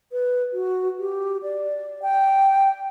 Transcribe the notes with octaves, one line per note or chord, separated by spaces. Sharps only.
B4
F#4
G4
D5
G5